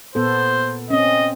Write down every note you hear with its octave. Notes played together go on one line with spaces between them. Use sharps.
A#2 B3 A4 C5
C4 C#4 D#5